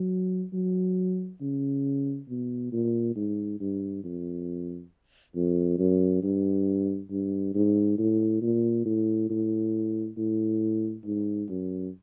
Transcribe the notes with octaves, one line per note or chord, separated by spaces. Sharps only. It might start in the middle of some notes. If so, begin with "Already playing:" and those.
Already playing: F#3
F#3
C#3
B2
A#2
G#2
G2
F2
F2
F#2
G2
G2
G#2
A2
A#2
A2
A2
A2
G#2
F#2